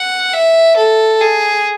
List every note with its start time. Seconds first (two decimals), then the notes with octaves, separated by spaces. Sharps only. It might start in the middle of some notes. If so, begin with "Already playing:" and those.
Already playing: F#5
0.33 E5
0.76 A4
1.20 G#4